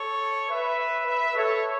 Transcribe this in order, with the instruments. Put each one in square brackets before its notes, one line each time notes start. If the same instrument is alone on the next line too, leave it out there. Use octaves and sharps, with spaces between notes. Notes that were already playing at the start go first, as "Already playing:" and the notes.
Already playing: [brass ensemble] A4 C#5
B4 E5
B4 E5
A4 C#5